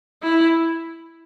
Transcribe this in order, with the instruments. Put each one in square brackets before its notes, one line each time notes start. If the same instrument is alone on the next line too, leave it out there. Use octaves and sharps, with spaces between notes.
[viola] E4